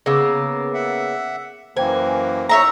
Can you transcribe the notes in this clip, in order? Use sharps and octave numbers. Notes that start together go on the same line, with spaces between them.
C#3 A#3 B3 D6 E6 A#6
E5 F#5
F#2 E3 A#3 C5 G5 G#5
D#4 C#5 E5 A#5